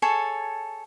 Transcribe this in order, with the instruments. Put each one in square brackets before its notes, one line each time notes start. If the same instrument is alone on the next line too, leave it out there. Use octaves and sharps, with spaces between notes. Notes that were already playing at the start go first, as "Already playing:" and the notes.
[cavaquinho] G#4 A4 C#5 A5